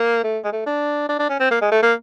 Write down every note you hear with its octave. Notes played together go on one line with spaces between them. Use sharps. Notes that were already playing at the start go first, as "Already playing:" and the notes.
Already playing: A#3
A3
G#3
A3
D4
D4
D4
C#4
C4
A#3
G#3
A3
A#3